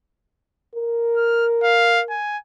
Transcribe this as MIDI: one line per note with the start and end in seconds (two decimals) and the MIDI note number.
0.75 2.18 70
1.17 1.46 89
1.64 2.01 77
2.10 2.37 80